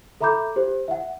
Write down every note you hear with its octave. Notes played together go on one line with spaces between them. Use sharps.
A4 E5 A#5 B5 D6 G6
G4 C5
E5 F#5